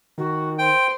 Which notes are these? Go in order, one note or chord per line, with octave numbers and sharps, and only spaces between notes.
D#3 F#4
C5 G5